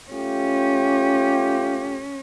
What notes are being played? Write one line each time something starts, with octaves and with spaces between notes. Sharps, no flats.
A3 C#4 F4 G4